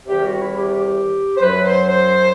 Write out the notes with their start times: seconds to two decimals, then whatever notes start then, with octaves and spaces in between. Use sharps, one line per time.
0.06 E2 C3 D#3 G3 G4
0.24 F#4
0.40 E4
0.57 G4
0.74 G4
1.36 C5
1.42 F#2 F#3 B4
1.64 C5
1.87 C5